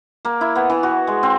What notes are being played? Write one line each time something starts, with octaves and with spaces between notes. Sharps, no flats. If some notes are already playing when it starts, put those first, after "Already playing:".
A#3
E4
B3
E3
F#4
G#3
C4